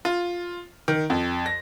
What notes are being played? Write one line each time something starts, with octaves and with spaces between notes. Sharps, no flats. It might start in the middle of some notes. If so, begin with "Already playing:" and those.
F4
D#3
F2
A#6